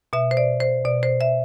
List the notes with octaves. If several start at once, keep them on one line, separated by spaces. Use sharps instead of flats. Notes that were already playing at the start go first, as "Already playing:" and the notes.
B2 E5
C5
D5
C5
B2 D5
C5
E5